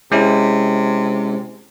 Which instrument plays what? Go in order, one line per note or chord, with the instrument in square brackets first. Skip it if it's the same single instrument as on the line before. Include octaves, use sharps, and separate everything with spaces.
[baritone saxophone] C3 [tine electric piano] G#3 C#4 E4